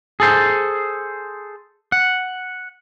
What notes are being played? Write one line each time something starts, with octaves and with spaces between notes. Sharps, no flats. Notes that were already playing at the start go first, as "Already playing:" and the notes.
G#4 A4 C5
F#5